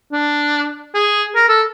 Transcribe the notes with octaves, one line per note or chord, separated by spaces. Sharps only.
D4
G#4
A#4
A4